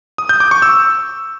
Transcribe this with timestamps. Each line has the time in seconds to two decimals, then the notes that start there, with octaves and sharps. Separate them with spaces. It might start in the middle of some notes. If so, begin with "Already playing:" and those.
0.18 D#6
0.29 G6
0.40 D6
0.51 C#6
0.62 E6